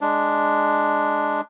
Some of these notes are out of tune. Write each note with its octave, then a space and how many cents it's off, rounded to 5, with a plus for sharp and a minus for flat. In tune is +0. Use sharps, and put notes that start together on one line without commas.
G#3 +0 D4 +0